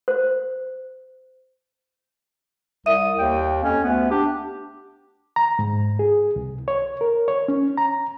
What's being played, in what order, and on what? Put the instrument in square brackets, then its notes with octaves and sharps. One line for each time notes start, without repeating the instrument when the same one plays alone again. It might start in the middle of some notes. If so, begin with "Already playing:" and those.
[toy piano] C5
[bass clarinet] C2 [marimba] E5 [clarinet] D#6
[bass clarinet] D#2 [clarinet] G5
[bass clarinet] F2 [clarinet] C#4
[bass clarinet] D2 [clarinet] B3
[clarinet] D4 [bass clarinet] G4
[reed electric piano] A#5
G#2
G#4
C2
C#5
A#4
C#5
C#4
A#5